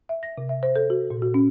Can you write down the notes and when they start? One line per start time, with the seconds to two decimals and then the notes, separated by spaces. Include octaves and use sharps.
0.09 E5
0.23 A#6
0.38 C3
0.49 E5
0.63 C5
0.76 A4
0.90 F#4
1.10 A#2
1.22 F#4
1.34 C#4